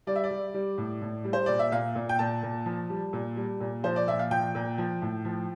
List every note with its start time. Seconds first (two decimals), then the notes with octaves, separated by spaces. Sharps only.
0.07 G3 D5
0.16 E5
0.24 D5
0.31 G3
0.54 G3
0.78 A2
1.02 A2
1.25 G3
1.33 C5
1.46 A#2 D5
1.59 E5
1.72 A#2 F5
1.96 A#2
2.09 G5
2.19 A#2 A5
2.43 A#2
2.66 F3
2.90 G3
3.13 A#2
3.37 G3
3.60 A#2
3.84 F3 C5
3.96 D5
4.08 A#2 E5
4.19 F5
4.31 F3 G5
4.55 A#2
4.78 F3
5.02 A2
5.25 F3